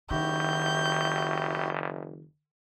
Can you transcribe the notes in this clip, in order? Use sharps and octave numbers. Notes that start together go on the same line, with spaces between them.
F#1 D#3 E4 F#4 G4 G6